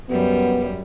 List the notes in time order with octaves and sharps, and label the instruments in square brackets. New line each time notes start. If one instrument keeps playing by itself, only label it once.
[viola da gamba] F#2 G3 [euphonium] B3